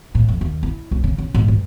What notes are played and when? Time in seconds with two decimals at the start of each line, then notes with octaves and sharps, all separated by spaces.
0.15 A2
0.28 F2
0.41 D#2
0.63 E4
0.91 C#2
1.04 C#3
1.18 C#3
1.34 G#2
1.48 G2